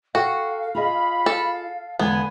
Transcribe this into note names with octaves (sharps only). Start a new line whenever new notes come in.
F#4 A4 F5 G5
F4 G#4 D#5 B5
A4
E2 D3 G#3 B3 G#5